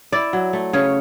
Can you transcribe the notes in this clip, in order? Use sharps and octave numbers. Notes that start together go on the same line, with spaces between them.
E4 D5
F#3
A3
C#3 C#5